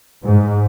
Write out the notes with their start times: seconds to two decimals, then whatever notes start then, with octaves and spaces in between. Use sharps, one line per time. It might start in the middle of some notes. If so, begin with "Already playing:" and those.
0.24 G#2